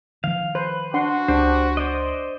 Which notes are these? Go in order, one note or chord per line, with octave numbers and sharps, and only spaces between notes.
D#3 F3 F5
B4 C5
D4 F#4 F#5 C6
C#2 D4 G4 C5
C5 D5 D#5